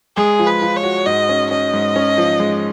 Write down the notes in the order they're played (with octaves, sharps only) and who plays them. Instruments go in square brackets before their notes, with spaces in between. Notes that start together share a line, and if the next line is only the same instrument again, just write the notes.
[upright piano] G#3 [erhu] G#4
[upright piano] F3
[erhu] B4
[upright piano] F3
[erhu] C#5
[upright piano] F#4
[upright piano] G#2 [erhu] D#5
[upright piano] C#4
[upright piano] C#4 [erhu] D#5
[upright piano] G#2
C#4
F3
G#3